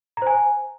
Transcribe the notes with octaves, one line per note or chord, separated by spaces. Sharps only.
C5 G#5 A#5